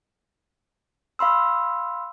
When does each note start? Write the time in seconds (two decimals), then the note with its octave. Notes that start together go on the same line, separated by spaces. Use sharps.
1.19 F5 B5 C6 E6